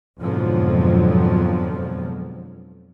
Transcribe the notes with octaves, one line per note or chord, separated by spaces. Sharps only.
F2 G#2 B2 D3 F3 F#3